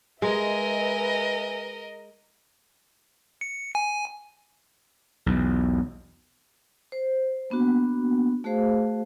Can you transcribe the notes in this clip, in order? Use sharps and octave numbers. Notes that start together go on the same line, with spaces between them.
G#3 A#4 B4 D#5 E5 G#5
C#7
G#5
B1 E2
C5
A#3 B3 D4 F#4
A3 F#4 G#4 C5 F5